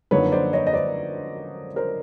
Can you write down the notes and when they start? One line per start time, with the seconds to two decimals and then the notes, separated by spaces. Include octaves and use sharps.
0.11 F#2 D3 F3 A#3 D#4 B4 C#5
0.32 C5 D5
0.53 C#5 D#5
0.67 D#5
0.73 C5 D5
1.76 A#4 C5